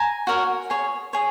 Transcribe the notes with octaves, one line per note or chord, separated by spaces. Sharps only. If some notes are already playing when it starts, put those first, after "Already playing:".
Already playing: G#5 A#5
F#4 A#4 C#5
G#4 C#5
G#4 C#5